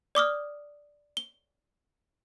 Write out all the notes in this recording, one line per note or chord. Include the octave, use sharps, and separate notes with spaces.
D5 D6 D#6 F6
G7